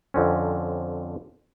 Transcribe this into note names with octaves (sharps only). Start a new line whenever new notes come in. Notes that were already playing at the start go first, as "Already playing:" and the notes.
F2 D3 C4 C#4